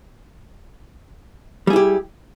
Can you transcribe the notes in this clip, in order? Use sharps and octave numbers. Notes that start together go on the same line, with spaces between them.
G3 E4 G4 G#4